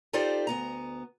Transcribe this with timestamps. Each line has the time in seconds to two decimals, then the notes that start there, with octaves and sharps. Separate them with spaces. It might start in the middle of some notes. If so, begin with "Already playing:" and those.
0.13 D#4 F4 G4 A4 C5 D5
0.47 D2 B3 A#5